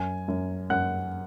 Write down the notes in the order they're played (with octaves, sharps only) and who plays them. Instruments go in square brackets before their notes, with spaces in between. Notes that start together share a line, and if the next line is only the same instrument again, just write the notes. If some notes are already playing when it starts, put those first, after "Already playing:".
Already playing: [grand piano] F#2 G#5
F#2
F#2 F#5 F#6